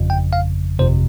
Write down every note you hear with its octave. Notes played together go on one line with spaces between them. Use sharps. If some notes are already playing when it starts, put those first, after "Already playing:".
Already playing: G1 F2 C#3
G5
F5
G1 F2 C3 C5